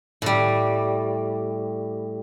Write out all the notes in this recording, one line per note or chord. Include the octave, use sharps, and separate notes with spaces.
A2 G3